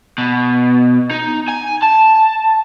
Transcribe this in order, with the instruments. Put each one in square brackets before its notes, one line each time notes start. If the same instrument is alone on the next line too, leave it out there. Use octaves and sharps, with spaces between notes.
[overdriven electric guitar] B2
D#4
G#5
A5